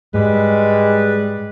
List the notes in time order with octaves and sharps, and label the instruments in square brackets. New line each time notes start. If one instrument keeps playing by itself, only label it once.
[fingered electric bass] G#2 [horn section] G3 B4 [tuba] G#3